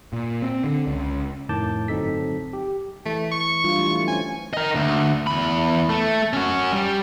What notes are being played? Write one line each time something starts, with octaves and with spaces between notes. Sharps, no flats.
A#2
C4
D3
C#2
F2 A2 D#3 A5 D6 G6
G1 F#3 C4 D#4 A4 B6
G4
E3 A3
C#6
G3 D4 F4
E3 F#3 A3
C#4 C5 G#5
A#4 D#5
D2
E2 B5
A3
C#4 F#4
G3